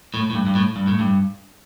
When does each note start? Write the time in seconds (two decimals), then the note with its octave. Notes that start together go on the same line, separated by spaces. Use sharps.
0.14 A2
0.30 A2
0.35 G2
0.47 G2
0.55 A2
0.76 G2
0.87 A2
0.99 G2